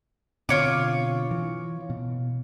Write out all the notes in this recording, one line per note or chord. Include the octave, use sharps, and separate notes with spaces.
B2 D3 C4 F4 C#5 D6
E3
B2